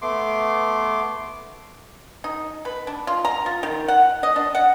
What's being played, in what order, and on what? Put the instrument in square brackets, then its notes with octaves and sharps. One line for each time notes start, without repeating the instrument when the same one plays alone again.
[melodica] A3 B3 C6 D6
[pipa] D#4
B4
D4
F4
A#5
F4
D#3
F#5
D#5
D4
F#5